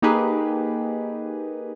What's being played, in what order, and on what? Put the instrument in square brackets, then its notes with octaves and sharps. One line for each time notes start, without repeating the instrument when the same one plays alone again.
[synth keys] A#3 D#4 G4 G#4 B4